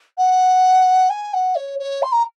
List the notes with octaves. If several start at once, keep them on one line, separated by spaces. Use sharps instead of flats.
F#5
G#5
F#5
C#5
C#5
C6
A#5